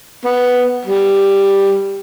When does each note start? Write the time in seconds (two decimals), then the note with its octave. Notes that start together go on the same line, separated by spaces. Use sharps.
0.25 B3
0.85 G3